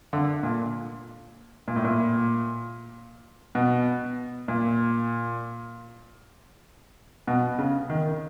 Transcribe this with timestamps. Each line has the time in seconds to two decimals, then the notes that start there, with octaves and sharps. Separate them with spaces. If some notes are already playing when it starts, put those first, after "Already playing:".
0.13 D3
0.43 A#2
1.68 A#2
1.76 A2
1.85 A#2
3.55 B2
4.48 A#2
7.27 B2
7.59 C#3
7.89 D#3